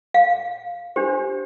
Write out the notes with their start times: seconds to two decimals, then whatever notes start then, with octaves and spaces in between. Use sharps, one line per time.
0.14 F5
0.96 D4 G4 C5